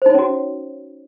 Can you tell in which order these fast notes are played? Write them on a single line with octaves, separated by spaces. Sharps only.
C5 D#4 C#5 C#4 F#4